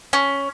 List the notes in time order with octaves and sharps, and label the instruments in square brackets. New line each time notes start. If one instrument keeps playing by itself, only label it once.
[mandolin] C#4